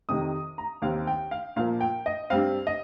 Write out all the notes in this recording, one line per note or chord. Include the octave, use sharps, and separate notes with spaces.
F2 C3 D#3 D#6
A#5
D#2 D#3 C4 F5
G5
F5
A#2 F3 A#3 F5
G5
D#5
G2 G3 C4 F5
D#5